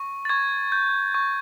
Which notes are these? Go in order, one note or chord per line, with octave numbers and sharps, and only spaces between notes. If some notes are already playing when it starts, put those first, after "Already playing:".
Already playing: C#6
A6
C#6 G#6
G6
C#6